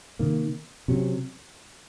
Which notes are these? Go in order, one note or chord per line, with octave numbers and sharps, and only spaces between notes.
C3 D#3 A#3
C3 F#3 C#4